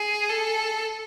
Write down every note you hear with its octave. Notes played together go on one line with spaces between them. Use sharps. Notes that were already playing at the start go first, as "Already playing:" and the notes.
Already playing: G#4
A4